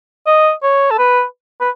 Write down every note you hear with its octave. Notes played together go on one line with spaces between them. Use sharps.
D#5
C#5
A4
B4
B4